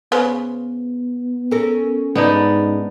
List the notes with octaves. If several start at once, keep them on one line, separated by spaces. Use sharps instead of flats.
C#3 B3 B4 C5
C#4 A4 A#4
G#2 B3 D4 D#4